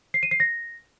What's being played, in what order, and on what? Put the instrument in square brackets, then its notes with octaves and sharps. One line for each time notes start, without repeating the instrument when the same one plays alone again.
[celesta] C7
D#7
C7
A#6